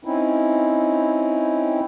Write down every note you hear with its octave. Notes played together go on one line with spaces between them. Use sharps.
C4 C#4 D#4 E4